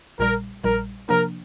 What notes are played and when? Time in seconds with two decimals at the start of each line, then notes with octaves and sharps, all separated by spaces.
0.19 A#1 A#2 G3 A#4
0.64 A#1 A#2 G3 A#4
1.09 C3 F3 A#3 D4 A#4